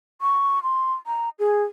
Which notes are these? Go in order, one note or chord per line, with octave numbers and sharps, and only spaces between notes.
C#6
C6
A#5
G#4